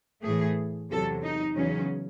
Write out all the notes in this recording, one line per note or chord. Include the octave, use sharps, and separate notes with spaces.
A2 E3 A3 G#4
E2 C3 F#3 A4
D#4
E2 C#3 F#3 C#4